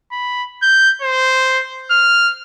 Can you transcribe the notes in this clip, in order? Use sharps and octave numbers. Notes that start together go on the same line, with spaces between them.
B5
G6
C5
F6